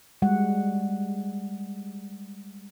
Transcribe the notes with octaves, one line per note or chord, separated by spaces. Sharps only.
G3 G#3 F#5